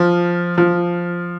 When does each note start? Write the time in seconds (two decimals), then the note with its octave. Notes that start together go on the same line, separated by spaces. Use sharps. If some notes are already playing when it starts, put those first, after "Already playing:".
Already playing: F3
0.58 F3